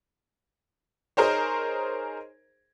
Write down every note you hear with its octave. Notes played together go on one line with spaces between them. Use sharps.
D#4 G#4 A#4 C5 C#5